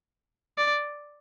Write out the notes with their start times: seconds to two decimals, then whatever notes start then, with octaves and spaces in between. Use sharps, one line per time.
0.58 D5